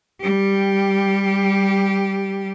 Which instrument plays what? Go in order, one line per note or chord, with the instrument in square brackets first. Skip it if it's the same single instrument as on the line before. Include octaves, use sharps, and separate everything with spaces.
[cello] G3 G4